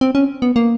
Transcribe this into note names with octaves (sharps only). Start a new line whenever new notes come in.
C4
C#4
B3
A#3